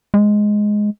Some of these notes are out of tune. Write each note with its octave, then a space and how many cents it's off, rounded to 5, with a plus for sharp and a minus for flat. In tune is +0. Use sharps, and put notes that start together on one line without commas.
G#3 +5